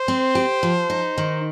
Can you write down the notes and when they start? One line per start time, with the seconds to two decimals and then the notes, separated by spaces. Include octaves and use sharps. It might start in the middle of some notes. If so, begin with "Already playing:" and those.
Already playing: C5
0.08 C4
0.35 G4
0.63 F3
0.90 D#4
1.18 D#3